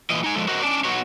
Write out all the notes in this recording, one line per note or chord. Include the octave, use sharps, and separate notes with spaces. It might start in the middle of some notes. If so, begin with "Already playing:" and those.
A#2 E3 D#5
D#4 G#5
F3 G#3 A4
F#4 A#4 C5 D#5 F#5
C#4 D4 D5
B3 D#4 F#4 C#5